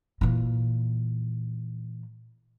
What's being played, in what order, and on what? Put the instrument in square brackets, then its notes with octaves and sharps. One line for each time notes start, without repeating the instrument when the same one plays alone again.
[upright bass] A#2 E3